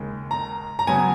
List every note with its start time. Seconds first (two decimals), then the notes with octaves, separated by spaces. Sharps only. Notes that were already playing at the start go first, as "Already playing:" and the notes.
Already playing: D#2 C#3 G#3
0.31 A#5
0.79 A#5
0.87 C#3 F#3 B3 G#5